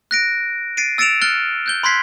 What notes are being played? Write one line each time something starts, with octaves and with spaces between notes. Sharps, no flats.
F#6 A#6 D7
A6 C7 D7 D#7
E6 A6 C#7 D7 E7 F7
F6 F#6 A6 C#7 G7
F#6 G6 G7
B5 C6 F#6 G#6 B6 C7